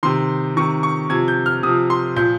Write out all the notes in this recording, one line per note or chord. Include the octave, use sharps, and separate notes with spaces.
C3 D#3 C6
C3 D#3 C#6
C#6
C3 F3 G#6
G6
F6
C3 F3 D#6
C6
A#2 F3 G6